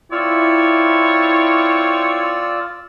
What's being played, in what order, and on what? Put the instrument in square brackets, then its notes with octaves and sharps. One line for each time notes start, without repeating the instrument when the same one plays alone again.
[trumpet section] C4 C#5 [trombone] E4 [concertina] F4 D5 E6